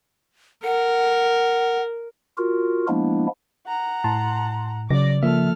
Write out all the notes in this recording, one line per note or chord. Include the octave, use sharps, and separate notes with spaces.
A#4 F#5
F4 F#4 A#4
F3 G#3 A#3 B3 D4 E4
F#5 A#5
A2 A5 C6
C#3 F#3 D5 D6 A#6
F3 A#3 A4 E5 F6